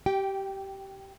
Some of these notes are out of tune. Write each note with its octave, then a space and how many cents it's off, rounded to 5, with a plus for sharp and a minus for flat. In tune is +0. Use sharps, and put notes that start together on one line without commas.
G4 -20 G5 +0